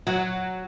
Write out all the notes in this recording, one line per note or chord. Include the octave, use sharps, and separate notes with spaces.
F#3